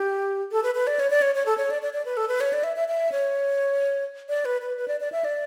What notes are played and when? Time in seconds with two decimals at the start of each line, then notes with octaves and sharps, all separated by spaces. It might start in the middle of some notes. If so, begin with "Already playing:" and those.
Already playing: G4
0.52 A4
0.63 B4
0.75 B4
0.87 D5
0.99 C#5
1.10 D5
1.22 C#5
1.35 C#5
1.46 A4
1.58 C#5
1.70 D5
1.82 D5
1.93 D5
2.05 B4
2.17 A4
2.28 B4
2.41 C#5
2.53 D5
2.64 E5
2.76 E5
2.88 E5
3.12 C#5
4.29 D5
4.45 B4
4.61 B4
4.77 B4
4.88 D5
5.00 D5
5.12 E5
5.25 D5